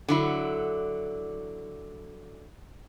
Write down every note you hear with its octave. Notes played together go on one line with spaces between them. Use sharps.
D3 F#3 E4